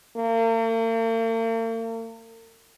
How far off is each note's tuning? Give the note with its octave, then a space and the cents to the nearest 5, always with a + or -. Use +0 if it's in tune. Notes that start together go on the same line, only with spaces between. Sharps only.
A#3 -45